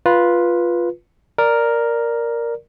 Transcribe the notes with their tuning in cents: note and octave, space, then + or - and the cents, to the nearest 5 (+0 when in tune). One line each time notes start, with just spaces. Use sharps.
F4 +0 B4 -10
A#4 +0 D5 +0